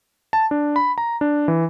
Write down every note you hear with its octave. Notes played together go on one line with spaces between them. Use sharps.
A5
D4
B5
A#5
D4
E3